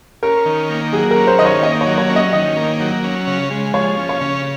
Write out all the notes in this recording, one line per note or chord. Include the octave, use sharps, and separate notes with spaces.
C#4 A#4
D#3
A#3
F#3 G#4
A#4
C#4
C5
D#3 D#5
C#5
A#3 D#5
C#5
F#3
C#5
C#4
D#5
D#3 D#5
A#3
F#3
C#4
C#3
G#3
F3 C#5
C#4
C#5
C#3